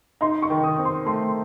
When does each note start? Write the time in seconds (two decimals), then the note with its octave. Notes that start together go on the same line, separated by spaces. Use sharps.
0.21 D#4 C6
0.42 C#6
0.50 D#3
0.64 D#6
0.79 C4
0.85 C6
1.06 A3 C6